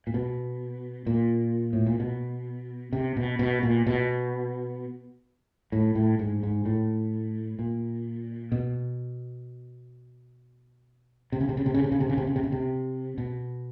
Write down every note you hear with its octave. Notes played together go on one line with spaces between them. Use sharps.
A#2
B2
A#2
A2
A#2
B2
C3
B2
B2
A#2
B2
A2
A2
G#2
G#2
A2
A#2
B2
C3
C#3
C3
C#3
C3
C#3
C3
C#3
C3
C#3
C3
C#3
C3
C#3
C3
B2